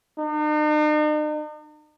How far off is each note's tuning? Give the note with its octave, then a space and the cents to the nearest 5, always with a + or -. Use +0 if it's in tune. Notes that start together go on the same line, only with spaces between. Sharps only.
D#4 -45